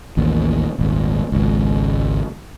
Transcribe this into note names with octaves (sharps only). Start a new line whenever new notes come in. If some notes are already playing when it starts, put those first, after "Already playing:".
A1 D#2
D#1 G#1
G#1 C#2